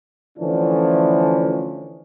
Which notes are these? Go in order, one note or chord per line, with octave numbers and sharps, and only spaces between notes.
D3 E3 F3 A3 C#4 D4